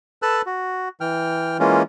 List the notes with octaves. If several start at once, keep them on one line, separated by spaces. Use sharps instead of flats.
A4 B4 A5 E6 F#6
F#4
E3 G5 F6
E3 G#3 A#3 C#4 F4